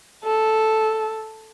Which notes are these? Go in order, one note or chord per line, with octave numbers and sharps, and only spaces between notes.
A4